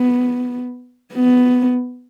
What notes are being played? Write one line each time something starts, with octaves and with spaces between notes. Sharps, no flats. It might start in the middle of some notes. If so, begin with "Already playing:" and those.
Already playing: B3
B3